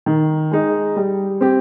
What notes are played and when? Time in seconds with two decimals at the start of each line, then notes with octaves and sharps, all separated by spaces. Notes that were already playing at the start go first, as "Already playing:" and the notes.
0.06 D#3
0.51 G#3 D#4
0.96 G3
1.41 C4 G4